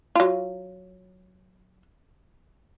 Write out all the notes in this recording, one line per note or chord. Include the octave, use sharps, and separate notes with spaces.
F#3 F4